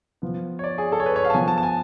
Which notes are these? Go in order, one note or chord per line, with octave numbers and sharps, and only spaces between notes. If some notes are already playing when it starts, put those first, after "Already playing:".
F3 B3
C#5
D5
G#4
A4
C#5
B4
C#5
F5
A5
F3 B3 G#5
A5
A5
G#5